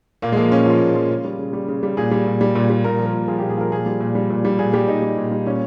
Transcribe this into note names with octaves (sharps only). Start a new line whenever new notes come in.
A#2 A#3
G#3
F3 A#3
A#2 C#4
F3 F4
A#2
F3
C#3
G3
C#3
G3
C#3
G3
A#2 G#4
G3
A#2
G3
A#2
G3
A#2 A#4
F3
A#4
A#2
F3 G#4
G4
A#2
G#4
F3 A#4
A#2 G#4
G3
A#2
G3
A#2
G3
A#2 G#4
G3 G4
A#2 D#4
G3
A#2
G3
A#2 C#4